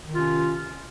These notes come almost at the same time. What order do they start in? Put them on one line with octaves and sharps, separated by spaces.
D#3 C3 F4 C#4